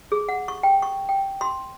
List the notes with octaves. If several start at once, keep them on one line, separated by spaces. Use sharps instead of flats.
G#4
F#5
C#6
G5
C#6
G5
C6